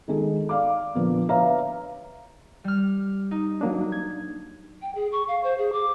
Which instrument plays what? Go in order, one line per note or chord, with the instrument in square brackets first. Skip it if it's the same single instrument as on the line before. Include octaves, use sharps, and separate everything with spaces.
[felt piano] D#3 G#3 G#4 A4
D5 F5 D6
A#2 D3 F3 A#3 B3
B4 C#5 E5 F5 A#5
[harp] G3 F6
D#4
[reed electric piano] F#3 A#3 D4
[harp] G#6
[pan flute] G5
G#4
C#6
F5
C5
G#4
D6